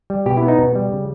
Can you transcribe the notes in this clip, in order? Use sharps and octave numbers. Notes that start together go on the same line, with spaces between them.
G3
B2 G4
E4
B3
D#4
B2
G3
C#3